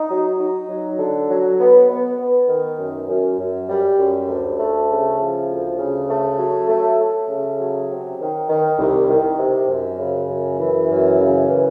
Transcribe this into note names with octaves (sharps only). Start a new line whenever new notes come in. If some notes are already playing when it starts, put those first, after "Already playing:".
Already playing: D#4
F#3
D#4
F#3
D3
F#3
B3
B3
B3
D#3
F#2
F#2
F#2
G3
F#2
D2
A3
C#3
F3
D2
C#3
A3
F#3
A3
A3
C#3
F#3
C3
D#3
D#3
C2
D#3
C3
F#2
C#3
F#2
E3
F#2
C#3
E3